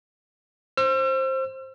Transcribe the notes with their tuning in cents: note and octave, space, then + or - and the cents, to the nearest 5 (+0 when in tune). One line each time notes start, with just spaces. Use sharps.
C5 +15 E6 +45